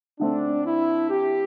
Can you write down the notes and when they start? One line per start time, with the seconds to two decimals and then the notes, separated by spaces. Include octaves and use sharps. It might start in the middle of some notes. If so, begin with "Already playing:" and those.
0.19 D3 A3 C4 D4
0.65 E4
1.10 G4